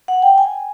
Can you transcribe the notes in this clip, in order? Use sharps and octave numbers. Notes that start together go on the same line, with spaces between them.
F#5
G5
G#5